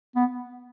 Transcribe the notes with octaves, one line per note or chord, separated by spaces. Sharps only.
B3